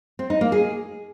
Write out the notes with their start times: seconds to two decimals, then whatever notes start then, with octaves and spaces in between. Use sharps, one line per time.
0.19 C4
0.30 D#4
0.41 A#3
0.52 G#4